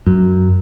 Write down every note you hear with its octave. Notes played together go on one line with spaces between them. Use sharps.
F#2